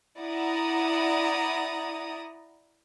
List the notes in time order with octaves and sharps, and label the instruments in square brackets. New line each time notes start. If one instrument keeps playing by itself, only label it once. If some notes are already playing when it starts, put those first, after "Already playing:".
[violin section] E4 D5 F#5 A#5 D#6